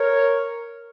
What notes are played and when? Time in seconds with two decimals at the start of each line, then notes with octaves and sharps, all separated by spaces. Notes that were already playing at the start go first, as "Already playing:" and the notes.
Already playing: A#4 C#5